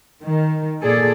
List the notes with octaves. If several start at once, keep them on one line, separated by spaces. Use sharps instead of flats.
D#3
A#2 G#4 A4 D5